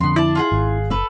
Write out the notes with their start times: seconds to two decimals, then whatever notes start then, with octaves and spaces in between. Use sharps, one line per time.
0.01 F2 D3 B3 C6
0.16 D4 E4 A5
0.35 F4 G#4 F#5
0.52 G#1
0.90 F#1 A4 B4